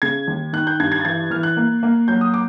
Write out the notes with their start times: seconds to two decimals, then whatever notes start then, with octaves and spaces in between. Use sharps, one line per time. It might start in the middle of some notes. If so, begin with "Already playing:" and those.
0.02 C#3 G#6
0.28 D#2
0.53 D#3 F#6
0.67 G6
0.80 G2 G#6
0.92 G#6
1.00 A6
1.05 E3 G#6
1.30 E3 F6
1.43 F#6
1.57 A#3
1.83 A#3
2.08 F#3 G6
2.21 D#6
2.34 D6